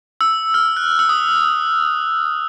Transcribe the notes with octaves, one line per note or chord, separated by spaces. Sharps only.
E6
F6
F#6
E6
D#6